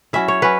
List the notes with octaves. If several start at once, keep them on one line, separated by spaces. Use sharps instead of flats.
F#3 C#4 E4 E5
C#5
F#3 C#4 B4